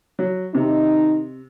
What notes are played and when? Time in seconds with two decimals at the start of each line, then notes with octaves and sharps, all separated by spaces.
0.19 F#3
0.55 C3 D#3 D#4